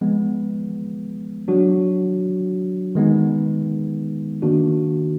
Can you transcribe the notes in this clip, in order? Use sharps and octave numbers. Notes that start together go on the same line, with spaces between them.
F3 G#3 B3
F#3 D4 F#4
D#3 G#3 B3 D#4
D#3 A#3 D4 F#4